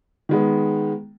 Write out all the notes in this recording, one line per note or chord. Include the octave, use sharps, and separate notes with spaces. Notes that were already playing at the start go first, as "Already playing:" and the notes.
D#3 G#3 B3